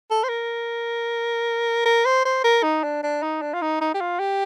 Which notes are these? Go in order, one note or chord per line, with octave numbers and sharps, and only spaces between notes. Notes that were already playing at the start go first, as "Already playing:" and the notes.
A4
C5
A#4
A#4
C5
C5
A#4
D#4
D4
D4
D#4
D4
F4
D#4
D#4
G4
F4
G4